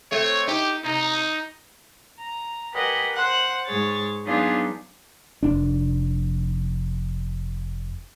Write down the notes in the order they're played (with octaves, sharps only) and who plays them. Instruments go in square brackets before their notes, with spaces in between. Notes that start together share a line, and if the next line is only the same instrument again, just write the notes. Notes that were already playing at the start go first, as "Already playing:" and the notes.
[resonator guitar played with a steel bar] A3 C4 [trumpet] C#5
[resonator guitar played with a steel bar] D#4 [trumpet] G4
[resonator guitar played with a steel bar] C3 [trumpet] D#4
[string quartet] A#5
G4 A#4 B4 D#5 F#5 G#5
C5 F#5 F#6
G#2 G#4 C#5 A6
F#3 B3 D4 D#4 F4 G#4
[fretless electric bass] F1 D4